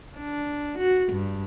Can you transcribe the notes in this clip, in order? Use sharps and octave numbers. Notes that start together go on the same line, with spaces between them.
D4
F#4
G2